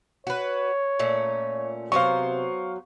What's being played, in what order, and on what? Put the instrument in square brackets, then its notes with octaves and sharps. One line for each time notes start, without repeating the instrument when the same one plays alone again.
[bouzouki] F#4 B4 [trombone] C#5
[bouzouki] A#2 A3 C#4
[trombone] C3 [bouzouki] F#3 B3 C5 [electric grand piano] F5 C#6